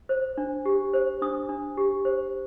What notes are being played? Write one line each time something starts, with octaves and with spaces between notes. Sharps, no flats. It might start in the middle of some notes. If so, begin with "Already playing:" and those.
C5
D4
G4
C5
D4 D#6
D4
G4
C5